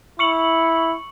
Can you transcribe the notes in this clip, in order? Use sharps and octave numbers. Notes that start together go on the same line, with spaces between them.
E4 C#6 C#7 F#7